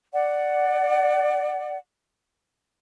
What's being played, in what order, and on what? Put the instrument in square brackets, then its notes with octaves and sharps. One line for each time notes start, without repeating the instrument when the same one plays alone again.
[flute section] D5 F#5